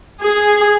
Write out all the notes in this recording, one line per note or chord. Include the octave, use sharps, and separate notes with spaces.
G#4